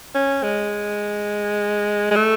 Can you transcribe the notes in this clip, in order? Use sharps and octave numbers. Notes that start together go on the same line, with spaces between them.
C#4
G#3
G#3
A3